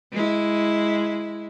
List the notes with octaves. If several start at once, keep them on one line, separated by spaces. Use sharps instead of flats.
G#3 E4